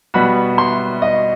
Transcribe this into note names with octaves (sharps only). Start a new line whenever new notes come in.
B2 G3 B3 F#4 B5
C6
D#5